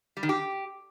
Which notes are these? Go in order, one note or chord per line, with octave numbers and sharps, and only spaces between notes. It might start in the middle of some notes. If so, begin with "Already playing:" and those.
G3
D#3
G4